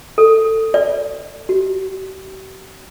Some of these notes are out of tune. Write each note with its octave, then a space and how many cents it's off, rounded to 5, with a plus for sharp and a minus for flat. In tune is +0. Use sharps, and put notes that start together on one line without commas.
A4 +15
D5 -25
G4 -45